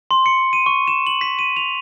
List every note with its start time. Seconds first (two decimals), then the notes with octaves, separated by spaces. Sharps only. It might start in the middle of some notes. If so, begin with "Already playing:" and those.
0.11 C6
0.26 C#7
0.53 D#7
0.66 C#6
0.87 E7
1.07 F#7
1.21 B6
1.39 D#7
1.57 F7